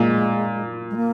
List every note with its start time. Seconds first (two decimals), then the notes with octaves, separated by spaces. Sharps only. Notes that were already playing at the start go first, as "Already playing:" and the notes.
Already playing: A#2 G#3
0.91 G#3
0.96 A#3